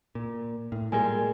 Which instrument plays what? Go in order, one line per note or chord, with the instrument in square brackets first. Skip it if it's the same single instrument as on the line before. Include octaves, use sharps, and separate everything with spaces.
[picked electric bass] A#2
A2
[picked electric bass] A#2 G3 G#3 [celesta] A#4 G#5